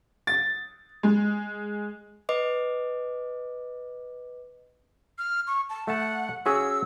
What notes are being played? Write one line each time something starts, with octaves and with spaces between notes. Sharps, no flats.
A6
G#3
B4 D#5 D6
F6
C#6
A5
A3 F#5 A5
C#4 F#4 G#4 E6